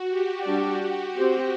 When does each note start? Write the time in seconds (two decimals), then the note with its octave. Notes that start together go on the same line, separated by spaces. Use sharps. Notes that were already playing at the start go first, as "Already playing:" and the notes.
Already playing: F#4
0.10 G4
0.45 G3 D4 G4 D5
1.15 C4 G4 C5